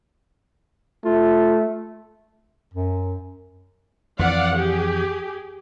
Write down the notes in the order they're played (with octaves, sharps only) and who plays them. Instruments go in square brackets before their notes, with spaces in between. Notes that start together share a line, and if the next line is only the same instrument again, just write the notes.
[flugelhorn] A3 [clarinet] F4
[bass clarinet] F#2
[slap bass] F2 E3 [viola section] D5 F5 F#5
[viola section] G4 G#4